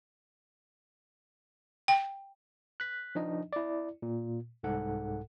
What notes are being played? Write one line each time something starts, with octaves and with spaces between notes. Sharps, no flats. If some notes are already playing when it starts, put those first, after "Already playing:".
G5
F#6 B6
F3 D4 D#4 D#5
E4 D5
A#2
C2 G#2 A4 F#5